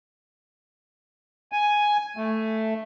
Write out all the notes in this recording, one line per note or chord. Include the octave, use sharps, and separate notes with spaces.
G#5
A3